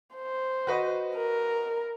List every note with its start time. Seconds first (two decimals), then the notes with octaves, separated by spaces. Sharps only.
0.15 C5
0.67 F#4 B4 D#5
1.14 A#4